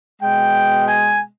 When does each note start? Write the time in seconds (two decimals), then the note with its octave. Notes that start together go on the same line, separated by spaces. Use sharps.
0.22 B2 G#3 G5
0.88 G#5